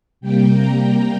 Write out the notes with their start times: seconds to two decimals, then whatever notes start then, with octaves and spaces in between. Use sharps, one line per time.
0.21 C3 G3 A#3 G5
0.51 A#5
0.82 A#5